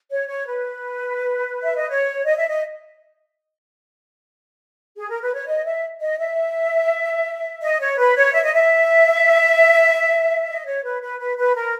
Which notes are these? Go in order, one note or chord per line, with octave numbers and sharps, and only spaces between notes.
C#5
C#5
B4
E5
D#5
C#5
D#5
E5
D#5
G#4
A#4
B4
C#5
D#5
E5
D#5
E5
D#5
C#5
B4
C#5
E5
D#5
E5
D#5
C#5
B4
B4
B4
B4
A#4